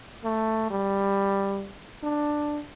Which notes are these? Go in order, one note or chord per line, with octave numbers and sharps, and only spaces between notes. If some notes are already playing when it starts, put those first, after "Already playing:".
A3
G3
D4